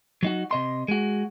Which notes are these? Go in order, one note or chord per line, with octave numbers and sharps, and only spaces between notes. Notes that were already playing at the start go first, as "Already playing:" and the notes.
F#3 D#4 F#4
C3 D#5 C6
G#3 F#4